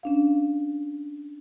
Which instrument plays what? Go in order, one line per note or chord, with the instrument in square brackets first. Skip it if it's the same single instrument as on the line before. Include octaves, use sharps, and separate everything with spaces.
[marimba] C#4 D4 F5